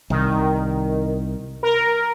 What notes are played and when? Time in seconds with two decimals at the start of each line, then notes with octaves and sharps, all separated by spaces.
0.10 C2 D#3
1.63 A#4